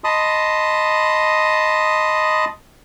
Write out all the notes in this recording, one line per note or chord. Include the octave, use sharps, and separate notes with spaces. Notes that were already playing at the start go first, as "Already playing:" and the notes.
D#5 A5 B5 C6 D#6